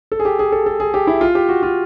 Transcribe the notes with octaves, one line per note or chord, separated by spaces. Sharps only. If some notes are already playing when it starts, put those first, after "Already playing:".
A4
G#4
G4
G#4
A4
A4
G#4
G4
E4
F4
G4
F#4
F4